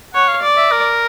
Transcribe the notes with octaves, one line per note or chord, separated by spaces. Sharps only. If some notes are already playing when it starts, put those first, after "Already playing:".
C#5 F#5
F5
D5
E5
A#4